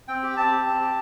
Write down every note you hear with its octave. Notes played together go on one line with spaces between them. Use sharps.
C4 G5
G4
C4 A5
G4
C4
G4